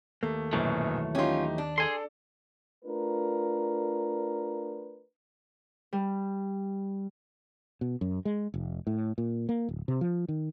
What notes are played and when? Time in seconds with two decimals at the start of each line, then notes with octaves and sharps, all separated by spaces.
0.23 D#2 A3 A#3
0.53 A#1 F#2 B2 E3 F#3 A3
1.15 C#4 D#4 F4 G4
1.58 D4
1.78 G#4 A4 D5 G#5 C6
2.85 A3 D4 F4 A#4 B4
5.93 G3
7.81 B2
8.01 F#2
8.25 G#3
8.54 F1
8.87 A2
9.18 A#2
9.49 A#3
9.69 D1
9.88 C3
10.01 F3
10.28 D#3